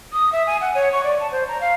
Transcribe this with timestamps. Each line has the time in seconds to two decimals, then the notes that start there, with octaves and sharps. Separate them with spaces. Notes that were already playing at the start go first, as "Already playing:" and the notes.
0.13 D#6
0.33 E5
0.47 G#5
0.61 F#5
0.75 C#5
0.92 C#6
1.04 D5
1.20 A5
1.32 C5
1.48 A#5
1.61 F5